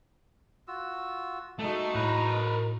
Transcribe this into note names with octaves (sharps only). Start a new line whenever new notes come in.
F4 F#4 E6
G#3 A3 D#4 F#4 A5
A2 A#4 B4